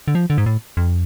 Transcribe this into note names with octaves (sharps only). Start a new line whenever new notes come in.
D3
F3
D3
G#2
A2
F2